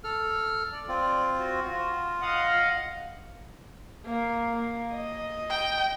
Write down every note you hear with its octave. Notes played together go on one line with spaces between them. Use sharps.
A4 F6
D5
C4 F4
F#4
F4
D#5 F5 F#5
A#3
A#3
D#5
G5